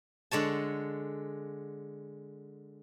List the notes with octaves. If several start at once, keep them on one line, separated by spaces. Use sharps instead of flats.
D3 G#3 C#5 A5